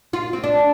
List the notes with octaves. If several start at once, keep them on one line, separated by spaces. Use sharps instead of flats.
F4
C4
D4